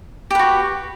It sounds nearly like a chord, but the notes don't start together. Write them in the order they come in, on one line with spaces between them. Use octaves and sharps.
G4 B4 F#4